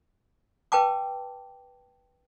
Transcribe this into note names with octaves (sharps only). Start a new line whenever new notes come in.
B4 G5 A5 D6